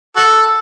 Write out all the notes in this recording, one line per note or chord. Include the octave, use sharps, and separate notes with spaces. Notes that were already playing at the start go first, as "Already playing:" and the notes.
F#4 A4